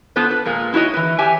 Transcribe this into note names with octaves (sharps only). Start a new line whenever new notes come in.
B3 F4 A4 B4 C5
B4
A#2 G#3 A#3
D#4 E4 F#4 C#5 D#5
E3 B4
G4 C#5 E5 G5 G#5